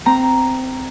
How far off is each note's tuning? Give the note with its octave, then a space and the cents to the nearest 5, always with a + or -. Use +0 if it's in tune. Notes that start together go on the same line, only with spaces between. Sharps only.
C4 -15 A#5 +0